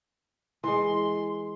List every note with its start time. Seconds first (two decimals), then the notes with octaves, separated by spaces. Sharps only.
0.64 E3 G#3 C6